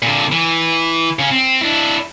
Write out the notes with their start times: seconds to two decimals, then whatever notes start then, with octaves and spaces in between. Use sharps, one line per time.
0.02 A#2 D3
0.32 E3
1.19 C#3 C#4
1.31 C4
1.61 D4 E4